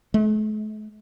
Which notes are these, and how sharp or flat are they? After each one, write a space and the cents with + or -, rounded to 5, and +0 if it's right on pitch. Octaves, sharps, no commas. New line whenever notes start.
A3 -45